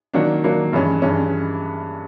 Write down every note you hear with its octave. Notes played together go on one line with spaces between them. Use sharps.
D#3 F#3 A#3 D4
D#3 F#3 A#3 D4
G2 E3 G#3 C#4
G2 E3 G#3 C#4